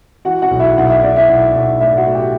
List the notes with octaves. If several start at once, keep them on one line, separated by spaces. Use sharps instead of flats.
E3 F#4 F#5
F#4 F#5
B1
E4 E5
B1 F#5
E5
B1 D5
E4 E5
B1
B1
A2 E4 E5
F#4 F#5
A2
G4 G5